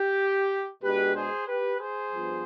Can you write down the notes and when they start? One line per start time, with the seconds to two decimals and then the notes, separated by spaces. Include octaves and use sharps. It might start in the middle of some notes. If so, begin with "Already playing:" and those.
Already playing: G4
0.83 B2 G#3 D4 G4 B4
1.15 G#4 C5
1.48 G4 B4
1.80 G#4 C5
2.12 G2 F3 B3 F4